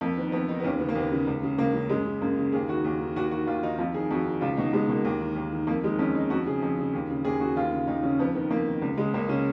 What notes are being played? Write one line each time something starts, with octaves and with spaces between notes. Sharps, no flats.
F2 A#3
D#3 B3
F2 B3
D#3 D#4
B3
D#2 C#4
C#3 B3
A#3
D#2 B3
C#3
C#2
C#3
C#2 A#3
C#3
F#2 G#3
C#3
F#2 A#3
C#3
D#2 G#4
D#3 F#4
D#2
D#3
D#2 F#4
D#3 F#4
D#2 F4
D#3 D#4
F2 F4
D#3 G#4
F2 F#4
D#3
C#2 F4
B2 D#4
C#2 G#3
B2 A#3
D#2
D#3
D#2
D#3
F2 A#3
D#3 G#3
F2 C#4
D#3 D#4
F2 F#4
C#3 G#4
F2
C#3
D#2
C#3
D#2 G#4
C#3 F#4
D#2 F4
C#3
D#2 D#4
C#3 C#4
F2 B3
D#3 B3
F2 A#3
D#3
C#2
C#3 G#3
C#2 A#3
C#3 C#4